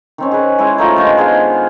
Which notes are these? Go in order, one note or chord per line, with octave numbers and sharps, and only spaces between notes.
D#3 C4 C#4
G#4 B4
G#3 E4 C5
A3 D#4 F4
D#3 G#3 D4 G4
B3 G#4 C5 F5